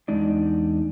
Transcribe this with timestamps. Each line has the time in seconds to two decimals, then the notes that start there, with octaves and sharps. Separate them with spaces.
0.08 E2 G#3 D4 D#4 D5